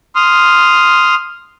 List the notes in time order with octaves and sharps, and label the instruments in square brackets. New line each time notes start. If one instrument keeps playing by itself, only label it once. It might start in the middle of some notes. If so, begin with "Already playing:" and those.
[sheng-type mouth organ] C6 D#6 F6